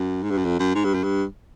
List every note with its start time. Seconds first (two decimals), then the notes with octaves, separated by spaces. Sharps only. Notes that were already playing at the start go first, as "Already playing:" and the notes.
Already playing: F#2
0.23 G#2
0.31 G2
0.38 F#2
0.45 F2
0.60 F#2
0.75 G#2
0.85 G2
0.94 F#2
1.04 G2